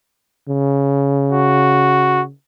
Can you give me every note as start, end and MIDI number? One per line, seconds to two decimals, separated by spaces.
0.48 2.31 49
1.32 2.22 66